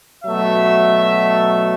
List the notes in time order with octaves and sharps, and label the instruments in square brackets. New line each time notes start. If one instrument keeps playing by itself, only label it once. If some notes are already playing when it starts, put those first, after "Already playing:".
[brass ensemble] B2 F#3 A3 E5